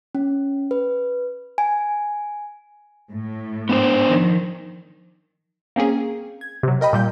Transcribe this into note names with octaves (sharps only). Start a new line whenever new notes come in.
C#4
B4
G#5
A2
B3 D4 C5
D#3 F3
A#3 C4 C#4 G#4
G#6
C3 F#3
A#4 D#5 G5 B5
A#2 G3 G6